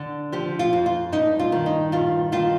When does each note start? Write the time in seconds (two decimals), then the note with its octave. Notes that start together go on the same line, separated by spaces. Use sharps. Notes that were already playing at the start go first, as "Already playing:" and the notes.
Already playing: D3
0.32 F3 G4
0.59 F4
0.73 F2
0.86 F4
1.12 G2 D#4
1.39 F4
1.52 D#3
1.66 D#4
1.92 G2 F4
2.32 D#3 F4